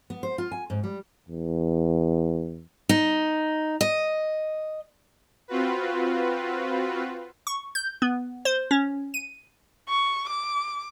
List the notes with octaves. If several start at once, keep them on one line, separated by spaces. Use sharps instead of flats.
B3
C5
F4
G#5
G#2
G3
E2
D#4
D#5
C4 F4 F#4 B4
C#6
G6
B3
C5
C#4
D#7
C#6
D6